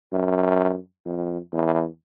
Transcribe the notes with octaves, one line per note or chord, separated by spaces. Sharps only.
F#2
F2
E2